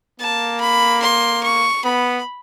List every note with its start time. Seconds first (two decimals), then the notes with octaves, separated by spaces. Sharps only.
0.20 A#3 A5
0.61 B5
1.03 C6
1.43 C#6
1.84 B3 B5